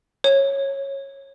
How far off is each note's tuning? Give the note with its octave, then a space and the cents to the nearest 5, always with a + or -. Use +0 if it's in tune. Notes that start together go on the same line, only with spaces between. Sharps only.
C#5 -15